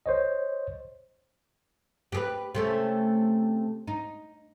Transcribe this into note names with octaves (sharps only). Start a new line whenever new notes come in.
C5 C#5 D#5
G4 G#4 B4
C3 A3 C#4
D#4